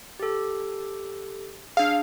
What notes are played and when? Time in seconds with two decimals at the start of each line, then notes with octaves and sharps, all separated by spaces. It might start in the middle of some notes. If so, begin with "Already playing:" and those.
0.19 G4 A4
1.77 D4 G#4 F5